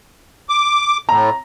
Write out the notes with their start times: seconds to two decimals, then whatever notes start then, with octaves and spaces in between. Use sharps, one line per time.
0.49 D6
1.09 A2 A#5